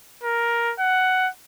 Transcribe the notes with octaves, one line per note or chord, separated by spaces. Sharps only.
A#4
F#5